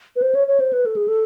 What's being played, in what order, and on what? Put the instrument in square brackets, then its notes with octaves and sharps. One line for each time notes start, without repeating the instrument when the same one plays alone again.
[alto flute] B4
C5
C#5
C#5
C5
B4
A4
G#4
A4